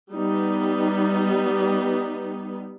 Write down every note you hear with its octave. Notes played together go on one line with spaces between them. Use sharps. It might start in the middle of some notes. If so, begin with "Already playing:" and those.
G3 B3 D#4